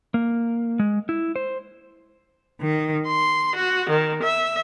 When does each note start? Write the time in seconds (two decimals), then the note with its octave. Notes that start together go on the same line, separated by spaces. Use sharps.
0.14 A#3
0.79 G#3
1.09 E4
1.36 C5
2.61 D#3
3.09 C6
3.56 F#4
3.90 D#3
4.23 E5